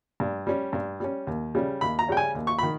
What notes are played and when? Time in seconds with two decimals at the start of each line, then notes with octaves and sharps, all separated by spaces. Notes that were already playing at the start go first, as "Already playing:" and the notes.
0.20 G2
0.47 G3 C#4
0.73 G2
1.00 G3 C#4
1.27 D#2
1.55 C#3 G3 C#4
1.81 D#2 B5
1.99 A#5
2.08 C#3 G3 C#4 G5
2.17 G#5
2.35 D#2
2.47 C#6
2.59 D#3 B5